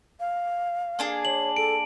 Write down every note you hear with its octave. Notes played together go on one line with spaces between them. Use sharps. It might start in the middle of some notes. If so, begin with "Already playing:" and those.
F5
A#3 D4 G#4
C#5 F#7
A4 D7